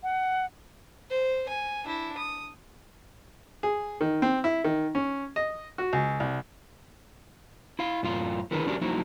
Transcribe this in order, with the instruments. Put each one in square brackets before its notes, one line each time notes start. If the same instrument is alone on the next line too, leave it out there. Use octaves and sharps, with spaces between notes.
[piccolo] F#5
[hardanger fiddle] C5
G#5
D4 E4
D#6
[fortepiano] G#4
D#3
C4
E4
D#3
C#4
D#5
F#4
C#2
C2
[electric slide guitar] E4 F5
F#2 A2 F4 F5
D3 D#3 E4 G#4 A#4 B4
F3 C#4 D4 F#4 G4 A#4
F3 F#3 A#3 D#4 E4 F#4